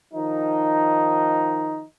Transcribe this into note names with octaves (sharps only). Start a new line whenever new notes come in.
D#3 F3 D#4